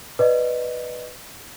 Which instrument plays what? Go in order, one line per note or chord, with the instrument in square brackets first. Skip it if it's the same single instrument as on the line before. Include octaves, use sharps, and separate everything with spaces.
[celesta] B4 D5 D#5